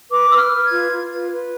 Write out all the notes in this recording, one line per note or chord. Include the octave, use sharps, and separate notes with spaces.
B4 D6
B4 E6
F6
B4
G#6
F4
F4
B4
B4